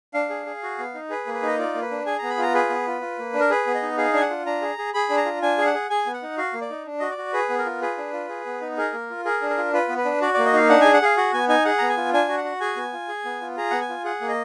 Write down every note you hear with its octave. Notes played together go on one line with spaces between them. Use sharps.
D4 F5
G#4
G#4
F#4
B3
D#4
G#4 B4
A#3
B4
D#4 D#5
F4 D5
A#3
B4
D4
G#4 G#5
B3 A#5
B5
F4
A#5
G#4 B4
B3
F4
F4
A#3
D4
A#4
G#4 B4
B3
D#5
D#4
G#4 F5
D4 G#5
F#5
F4
D4 A#5
G#4
G#4
G#4 B5
D4
A#5
F4
D4 G#5
G#4 F5
F#5
G#4
G#4 G#5
B3
F#5
D#4
F#4 F5
A#3
D5
D#4
D4
F#4 D#5
D5
F#4
G#4 B4
B3
A#4
F4
G#4 B4
D4
F4
G#4
B3
D#4
G#4 A#4
A#3
F4
G#4 A#4
D4
A#4
F4
F4 B4
B3
B4
D4
F#4 D5
A#3 D5
D#5
D#4 F5
D4 F#5
G#4 G#5
F#5
G#4 F5
F#4 F#5
B3 G#5
D#4 G#5
G#4 F#5
B3 A#5
G#5
F4
D4 G#5
F#4
F#5
F#4
G#4 G#5
B3
F4
G#4
B3
F4
G#4 A#5
B3 F#5
G#5
F4
G#4 F#5
A#3
D#5